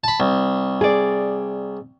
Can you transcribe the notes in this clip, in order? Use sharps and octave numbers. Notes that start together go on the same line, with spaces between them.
A5 B5
C2
G#4 D5